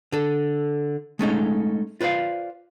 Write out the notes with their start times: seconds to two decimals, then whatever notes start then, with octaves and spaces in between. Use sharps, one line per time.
0.12 D3 A4
1.19 G#3 A3 C#4 D#4
2.01 F4 B4 C5 D5 F5